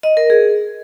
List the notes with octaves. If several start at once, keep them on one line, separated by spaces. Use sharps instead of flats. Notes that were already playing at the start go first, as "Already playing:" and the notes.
D#5
A#4
G#4